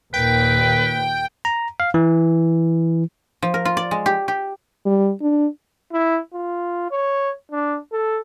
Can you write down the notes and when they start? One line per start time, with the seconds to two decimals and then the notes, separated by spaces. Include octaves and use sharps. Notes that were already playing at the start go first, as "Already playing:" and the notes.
0.14 D#2 A#2 B4 G5
1.45 A#5
1.80 F5
1.94 E3
3.42 F3
3.54 A#4
3.65 F4
3.77 D5
3.91 G#3
4.06 G4
4.28 G4
4.86 G3
5.22 D4
5.92 E4
6.34 F4
6.91 C#5
7.52 D4
7.92 A4